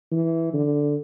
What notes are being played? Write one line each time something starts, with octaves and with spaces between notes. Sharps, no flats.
E3
D3